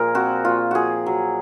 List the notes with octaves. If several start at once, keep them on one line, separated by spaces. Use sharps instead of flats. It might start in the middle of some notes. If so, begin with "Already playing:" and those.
Already playing: A#2 F3 G#4 A#4
C4 F#4
A#2 F4
F3 F#4 G#4
F#3